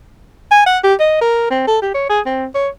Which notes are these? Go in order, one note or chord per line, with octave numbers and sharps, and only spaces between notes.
G#5
F#5
G4
D#5
A#4
C4
A4
G4
C#5
G#4
C4
C#5